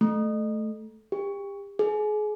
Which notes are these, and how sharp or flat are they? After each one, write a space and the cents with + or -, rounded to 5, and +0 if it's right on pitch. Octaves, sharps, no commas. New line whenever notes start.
A3 -10
G4 +30
G#4 +30